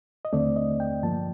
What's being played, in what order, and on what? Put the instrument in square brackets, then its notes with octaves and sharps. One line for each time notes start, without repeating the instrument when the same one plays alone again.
[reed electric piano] D#5
D#2 D3 A3 C4 D5
D#5
G5
G2 F3 A#3 A5